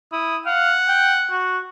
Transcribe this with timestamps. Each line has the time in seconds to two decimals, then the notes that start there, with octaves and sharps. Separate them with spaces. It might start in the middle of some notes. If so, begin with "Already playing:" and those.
0.12 E4 D#6
0.46 F5 F#5
0.88 G5
1.31 F#4